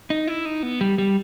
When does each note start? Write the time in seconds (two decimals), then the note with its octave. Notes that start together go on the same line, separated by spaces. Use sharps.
0.10 D#4
0.28 E4
0.45 D#4
0.63 B3
0.81 G3
0.98 G3